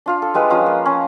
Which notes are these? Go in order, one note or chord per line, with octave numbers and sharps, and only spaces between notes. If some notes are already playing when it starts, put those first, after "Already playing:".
D4 F4 F5
A4
G3 G#3 B4 F5
F3 C#4 F5
A#3
C#4